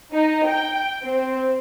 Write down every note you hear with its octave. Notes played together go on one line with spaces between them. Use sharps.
D#4
G5
C4